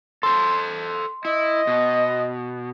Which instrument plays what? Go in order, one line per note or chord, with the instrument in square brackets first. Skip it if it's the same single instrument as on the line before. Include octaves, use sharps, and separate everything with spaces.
[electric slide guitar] A4 C5 [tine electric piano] C6
[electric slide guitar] E4 [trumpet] D#5
[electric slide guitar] B2